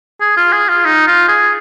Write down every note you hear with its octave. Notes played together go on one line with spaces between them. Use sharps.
G#4
F4
G#4
F4
D#4
F4
G#4